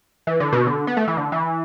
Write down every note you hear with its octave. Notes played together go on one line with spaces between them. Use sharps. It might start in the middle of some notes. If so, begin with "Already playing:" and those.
E3
D3
B2
D3
B3
A3
E3
D3
E3